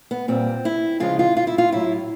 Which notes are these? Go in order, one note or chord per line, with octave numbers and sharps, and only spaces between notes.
B3
A#2 G3 C4
E4
C#3 F3 G#3 F4
F4
F4
E4
F4
A2 F#3 E4